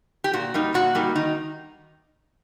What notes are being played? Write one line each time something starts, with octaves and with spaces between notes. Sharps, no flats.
G4
A#2 F#4
G3 A#3 D#4
A#2 F#4
G3 A#3 D#4
D#3 D#4